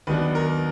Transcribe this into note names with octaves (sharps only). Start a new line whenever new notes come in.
D#2 D#3 F#3 B3 D4 B4
A#4